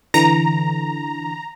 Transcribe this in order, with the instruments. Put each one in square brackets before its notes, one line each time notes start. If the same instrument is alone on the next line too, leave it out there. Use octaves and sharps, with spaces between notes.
[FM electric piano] D3 E3 [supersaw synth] A#5